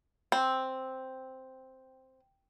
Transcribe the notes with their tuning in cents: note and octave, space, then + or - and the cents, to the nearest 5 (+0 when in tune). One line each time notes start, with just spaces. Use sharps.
C4 +0